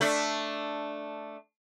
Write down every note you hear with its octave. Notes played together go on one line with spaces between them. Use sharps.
A3 D4